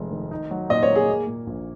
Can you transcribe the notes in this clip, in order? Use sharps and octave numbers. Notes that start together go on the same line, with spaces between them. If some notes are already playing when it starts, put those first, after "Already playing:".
Already playing: F1 F2 G#3
D#3
D#4
F#3
A#2 D#5
C#5
A#3
G#4
A#3
A#2
A#1